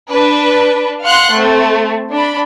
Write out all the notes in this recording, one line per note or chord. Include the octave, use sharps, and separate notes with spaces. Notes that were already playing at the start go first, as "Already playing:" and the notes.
D4 B4
F5 F#5 C6 F#6
A3 C4
D4 B5